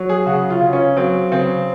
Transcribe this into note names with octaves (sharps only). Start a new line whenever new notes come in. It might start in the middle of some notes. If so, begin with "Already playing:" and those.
Already playing: F#3
G#4
C#3 F#4
F4
C#3
C#4
F#3 C4
C#3 C4